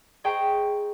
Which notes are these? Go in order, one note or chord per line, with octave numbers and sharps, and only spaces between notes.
G#4 C5 D#5 G5 A#5 C#6